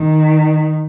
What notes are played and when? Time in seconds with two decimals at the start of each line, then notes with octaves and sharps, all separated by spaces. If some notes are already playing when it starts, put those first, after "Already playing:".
Already playing: D#3